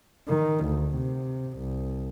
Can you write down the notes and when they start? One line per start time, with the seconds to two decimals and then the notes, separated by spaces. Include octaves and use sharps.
0.28 D#3
0.64 D2
0.96 C3
1.58 C2